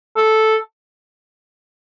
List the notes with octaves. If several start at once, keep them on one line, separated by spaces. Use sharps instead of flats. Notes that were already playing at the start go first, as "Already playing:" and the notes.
A4